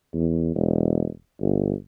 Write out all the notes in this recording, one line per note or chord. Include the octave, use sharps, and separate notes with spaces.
E2
E1
G1